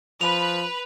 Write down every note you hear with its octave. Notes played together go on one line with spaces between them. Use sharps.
F3 B4 F7